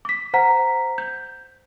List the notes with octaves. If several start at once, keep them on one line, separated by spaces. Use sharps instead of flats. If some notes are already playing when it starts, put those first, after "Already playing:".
D6 B6
C5 F#5 A#5 B6
G6